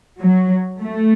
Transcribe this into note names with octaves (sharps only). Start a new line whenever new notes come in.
F#3
A3